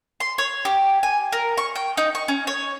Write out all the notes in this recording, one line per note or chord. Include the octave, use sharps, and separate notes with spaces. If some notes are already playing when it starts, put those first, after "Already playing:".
C6
C#5
G4
G#5
A#4
C#6
G5
D#4
C#6
C#4
C#5